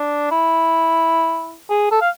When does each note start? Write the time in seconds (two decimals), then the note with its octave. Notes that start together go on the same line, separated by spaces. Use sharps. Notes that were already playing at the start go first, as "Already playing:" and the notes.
Already playing: D4
0.31 E4
1.70 G#4
1.91 A4
2.02 F5